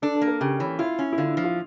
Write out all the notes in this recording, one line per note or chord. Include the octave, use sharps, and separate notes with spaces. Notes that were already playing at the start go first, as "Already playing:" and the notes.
D4 A4
A4
A#3
A#4
C#3 G4
E3 C#4
E4 F4
C#4
E4
D3 F4
F3
F4